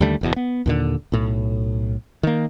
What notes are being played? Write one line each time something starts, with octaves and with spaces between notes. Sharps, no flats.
D#2 D3 G3 A3
F#1 E2 B2
B3
D#2 A#2 D3
B1 A2
D#3 A#3